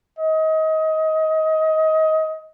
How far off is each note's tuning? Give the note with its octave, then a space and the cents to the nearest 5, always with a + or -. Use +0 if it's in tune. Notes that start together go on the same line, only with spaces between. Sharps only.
D#5 +25